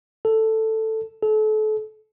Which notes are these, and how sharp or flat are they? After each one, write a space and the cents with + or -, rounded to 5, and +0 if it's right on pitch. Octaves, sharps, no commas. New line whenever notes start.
A4 +5
A4 -35